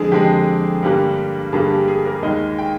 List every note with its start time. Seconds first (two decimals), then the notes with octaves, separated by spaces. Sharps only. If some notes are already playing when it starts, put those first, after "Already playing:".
Already playing: F2 D3 G#3 G#4
0.12 F2 D3 G#3 G4
0.83 G2 D3 G3 A#3
1.52 G2 D3 G3 A#3 G#4
1.70 G4
1.88 G#4
2.05 A#4
2.22 D#2 D#3 G#3 D#5
2.59 G5